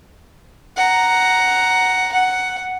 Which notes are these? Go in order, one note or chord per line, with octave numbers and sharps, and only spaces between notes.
F#5 A#5
F#5